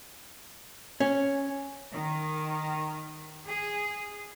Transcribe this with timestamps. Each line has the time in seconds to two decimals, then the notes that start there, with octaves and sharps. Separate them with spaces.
1.00 C#4
1.92 D#3
3.46 G#4